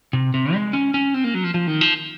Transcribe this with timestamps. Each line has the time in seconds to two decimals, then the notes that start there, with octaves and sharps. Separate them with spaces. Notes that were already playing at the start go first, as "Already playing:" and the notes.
0.13 C3
0.34 C3
0.54 G#3
0.73 C#4
0.94 C#4
1.14 C4
1.24 A#3
1.34 F#3
1.44 F3
1.54 F3
1.67 D#3
1.81 F3